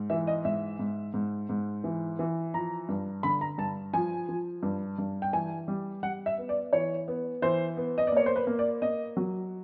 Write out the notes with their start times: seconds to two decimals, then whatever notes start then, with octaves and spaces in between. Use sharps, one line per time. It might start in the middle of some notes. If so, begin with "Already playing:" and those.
Already playing: G#2
0.10 E3 E5
0.27 D#5
0.45 G#2 E5
0.79 G#2
1.14 G#2
1.49 G#2
1.84 E3
2.19 E3
2.54 F3 A#5
2.89 G2
3.23 D3 B5
3.41 A#5
3.58 G2 A5
3.93 F3 G#5
4.29 F3
4.63 G2
4.98 G2
5.22 G5
5.33 E3 G#5
5.68 G3
6.03 G3 F#5
6.26 E5
6.38 B3
6.49 D5
6.73 E3 C#5
7.08 B3
7.42 E3 C5
7.77 B3
7.98 D#5
8.07 D5
8.12 A#3 C#5
8.26 C5
8.36 B4
8.47 A#3
8.59 D5
8.82 A#3 D#5
9.17 F#3